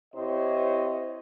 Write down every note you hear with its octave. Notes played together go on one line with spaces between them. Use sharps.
C3 E4 C5 C#5 D#5